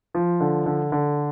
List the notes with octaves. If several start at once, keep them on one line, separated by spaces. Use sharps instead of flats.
F3
D3
D3
D3